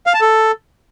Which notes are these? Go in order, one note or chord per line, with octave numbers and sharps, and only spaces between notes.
F5
A5
A4